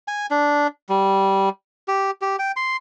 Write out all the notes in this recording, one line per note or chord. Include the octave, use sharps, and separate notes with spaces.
G#5
D4
G3
G4
G4
G5
C6